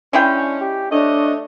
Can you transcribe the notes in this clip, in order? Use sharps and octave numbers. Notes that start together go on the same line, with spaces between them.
G#3 C#4 D4 E4 G5
G4
A3 D4 C#5 D#5